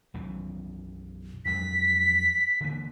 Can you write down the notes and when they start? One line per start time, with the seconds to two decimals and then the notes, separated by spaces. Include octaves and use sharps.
0.14 B1 F#2 E3
1.45 F2 F#3 G#3 B6
2.61 D3 E3 A#3